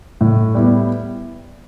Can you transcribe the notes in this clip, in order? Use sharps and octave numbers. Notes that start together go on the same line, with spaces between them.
A2
G3 B3 E4